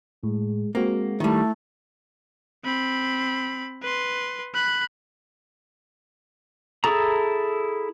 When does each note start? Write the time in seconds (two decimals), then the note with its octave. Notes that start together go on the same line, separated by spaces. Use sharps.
0.23 A2 G#3
0.75 G#3 A#3 C4 F#4
1.20 D#3 G3 A3 E4
2.64 C4 B5
3.82 B4 C6
4.54 B5 F#6
6.84 E4 G#4 A4 A#5